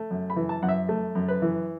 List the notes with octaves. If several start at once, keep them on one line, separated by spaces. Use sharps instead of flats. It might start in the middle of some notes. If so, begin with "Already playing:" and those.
Already playing: A3
F#2
B5
E3
A5
F#2 F#5
E5
A3
F#2
B4
E3